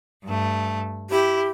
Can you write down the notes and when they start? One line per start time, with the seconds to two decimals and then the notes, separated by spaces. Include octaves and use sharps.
0.23 G2 A3
1.10 E4 G4